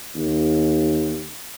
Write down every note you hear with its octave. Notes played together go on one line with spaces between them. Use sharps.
D#2